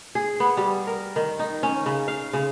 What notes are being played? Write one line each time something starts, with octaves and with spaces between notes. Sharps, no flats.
G#4
B3
G3
A#4
D#3
D#4
C#4
C#3
F5
C#3